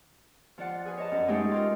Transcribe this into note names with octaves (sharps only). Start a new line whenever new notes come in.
F3 F4 D5 F#5
G#4 B4 G#5
C#5 D#5 A5
F#2
G#3 A3 C#4 D#4 G4 G#4
F4 G4 A#4